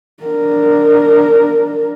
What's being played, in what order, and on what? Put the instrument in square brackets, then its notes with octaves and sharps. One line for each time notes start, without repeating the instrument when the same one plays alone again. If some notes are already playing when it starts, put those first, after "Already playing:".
[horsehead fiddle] D4 A#4